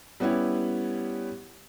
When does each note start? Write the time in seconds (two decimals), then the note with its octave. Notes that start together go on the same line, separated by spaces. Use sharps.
0.20 G3 B3 C#4 E4 G4